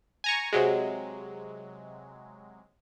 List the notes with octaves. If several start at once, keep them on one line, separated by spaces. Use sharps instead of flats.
G#5 A#5 C#6
C3 F#3 G#3